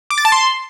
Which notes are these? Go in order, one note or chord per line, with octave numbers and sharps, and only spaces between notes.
D6
A6
A5
C6